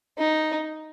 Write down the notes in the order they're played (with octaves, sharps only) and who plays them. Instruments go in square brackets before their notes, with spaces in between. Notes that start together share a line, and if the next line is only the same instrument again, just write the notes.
[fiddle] D#4